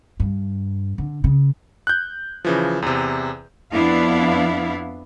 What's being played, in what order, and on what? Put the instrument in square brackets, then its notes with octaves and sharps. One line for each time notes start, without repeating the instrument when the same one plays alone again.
[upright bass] G2
D3
C#3
[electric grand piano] F#6 G6
C#3 E3 F3
E2 C3
[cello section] F2 B3 D4 E4 F5